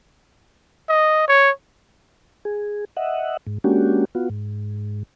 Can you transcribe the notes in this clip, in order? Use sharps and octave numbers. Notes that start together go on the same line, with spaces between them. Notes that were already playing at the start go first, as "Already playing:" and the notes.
D#5
C#5
G#4
D#5 E5 F#5
G#2
G#3 A#3 C#4 D4 F#4 G4
B3 F4 F#4
G#2